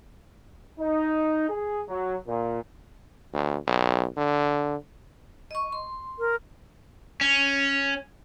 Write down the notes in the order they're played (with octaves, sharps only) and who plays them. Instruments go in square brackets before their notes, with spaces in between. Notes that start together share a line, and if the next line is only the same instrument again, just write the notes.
[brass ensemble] D#4
G#4
F#3
A#2
[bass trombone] D2
B1
D3
[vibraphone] D#5 C#6
C6
[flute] A#4
[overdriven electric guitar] C#4